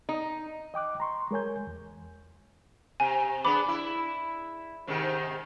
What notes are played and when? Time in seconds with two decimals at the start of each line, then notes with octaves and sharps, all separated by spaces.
0.09 D#4
0.74 D#5 G5 D6 F#6
1.00 A#5 C6 C#6
1.31 G#3 A#4 C#5 G#5 G6
1.67 E2
3.00 C3 G#5
3.45 B3 D4 G#4 B5 D6
3.68 E4
4.87 G#2 C3 D#3